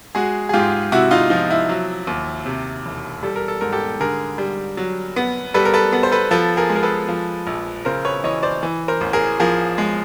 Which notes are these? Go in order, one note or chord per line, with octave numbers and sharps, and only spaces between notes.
G#3 F#4 G#4
G#4
G#2 F4 G4
C3 E4 F#4
D#4 F4
F3 D#4
E4
F#3
D#2
C3
E1
G3 A4
A#4
A4
G#2 A#4
G4 A4
D3 G#4 A#4
G3
F#3
B3
G3 A4 B4
A#4
A4 B4
B3
C5
A4 B4
F3 A4 B4
G#4 A#4
G#3
A#4
A4 B4
F3
A#1
C#3 A#4 C5
B4 C#5
E3 C#5 D#5
C5 D5
E3
A#4 C5
A1
G#4 A#4
F3 G#4 A#4
G#3